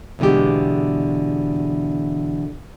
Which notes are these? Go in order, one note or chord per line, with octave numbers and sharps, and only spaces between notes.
E2 B2 D3 G#3 G4